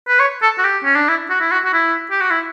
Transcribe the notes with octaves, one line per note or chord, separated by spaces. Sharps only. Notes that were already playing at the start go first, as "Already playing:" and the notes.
B4
C#5
A4
F#4
G4
C#4
D4
E4
F#4
E4
F#4
F#4
E4
G4
F#4
E4